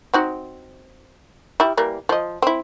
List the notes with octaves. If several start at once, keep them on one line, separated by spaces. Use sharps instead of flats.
C4 D#4 F#4
G3 E4
E3 G3 A#3
F3 D#5
C4 E4